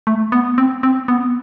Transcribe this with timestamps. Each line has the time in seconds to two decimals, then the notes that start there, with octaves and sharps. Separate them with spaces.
0.07 A3
0.32 B3
0.58 C4
0.83 C4
1.08 B3